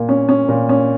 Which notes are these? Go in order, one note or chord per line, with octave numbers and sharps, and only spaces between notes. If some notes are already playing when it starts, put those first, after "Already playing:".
Already playing: A#2 A#3
C#4
C#4
A#2
C#4